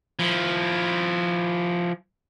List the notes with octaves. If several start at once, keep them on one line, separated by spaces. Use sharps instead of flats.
F3 E4